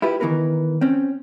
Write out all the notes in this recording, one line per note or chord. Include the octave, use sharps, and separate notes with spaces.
E4 F4 G4 B4
D#3 E3 A3 B3 A#4 B4
C4 C#4